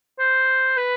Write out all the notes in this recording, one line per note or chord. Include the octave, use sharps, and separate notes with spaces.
C5
B4